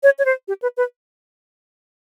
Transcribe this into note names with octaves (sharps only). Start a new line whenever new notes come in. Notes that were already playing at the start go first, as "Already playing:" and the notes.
C#5
C#5
C5
G4
B4
B4